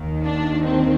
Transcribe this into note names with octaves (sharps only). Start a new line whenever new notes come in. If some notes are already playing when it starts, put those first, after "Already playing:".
Already playing: D#2 D#3
D4
C4